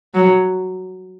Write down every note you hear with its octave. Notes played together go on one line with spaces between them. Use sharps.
F#3